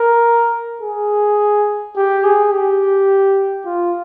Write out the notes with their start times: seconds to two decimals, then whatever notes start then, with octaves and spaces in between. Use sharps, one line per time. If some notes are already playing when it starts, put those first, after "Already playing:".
Already playing: A#4
0.82 G#4
1.96 G4
2.24 G#4
2.52 G4
3.66 F4